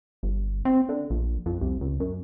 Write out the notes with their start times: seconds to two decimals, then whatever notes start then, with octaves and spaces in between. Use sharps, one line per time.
0.23 G1
0.65 C4
0.89 D3
1.10 A#1
1.46 F2
1.61 C2
1.81 C#2
2.00 F#2